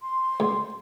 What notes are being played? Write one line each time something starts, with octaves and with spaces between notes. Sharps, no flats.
C6
C#2